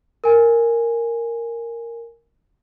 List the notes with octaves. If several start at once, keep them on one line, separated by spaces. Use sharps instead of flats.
A#4 G#5